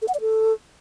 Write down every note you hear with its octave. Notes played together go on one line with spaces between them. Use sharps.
A4
F#5
D5
A4